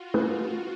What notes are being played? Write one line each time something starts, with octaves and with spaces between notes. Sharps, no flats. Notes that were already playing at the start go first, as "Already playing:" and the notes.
Already playing: F4 F#4
A3 C#4 E4 F#4 G#4 B4